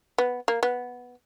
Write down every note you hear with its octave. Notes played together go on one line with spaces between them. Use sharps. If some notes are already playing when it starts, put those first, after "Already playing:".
B3
A#3
B3